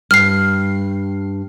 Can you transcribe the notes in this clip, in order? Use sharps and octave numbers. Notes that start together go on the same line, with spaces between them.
G2 F6 C7